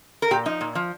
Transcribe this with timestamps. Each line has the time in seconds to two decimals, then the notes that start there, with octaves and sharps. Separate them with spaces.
0.22 A#4
0.31 A#2 G4
0.46 F3 D#4
0.61 A#2
0.75 F3